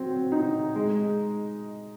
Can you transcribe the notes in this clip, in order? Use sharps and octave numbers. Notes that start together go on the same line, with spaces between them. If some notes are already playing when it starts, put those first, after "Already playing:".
Already playing: F#3 C4
D#4
G#3